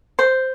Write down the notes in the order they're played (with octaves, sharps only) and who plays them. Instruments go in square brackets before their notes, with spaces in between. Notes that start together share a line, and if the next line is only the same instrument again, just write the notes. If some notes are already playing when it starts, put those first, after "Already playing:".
[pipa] C5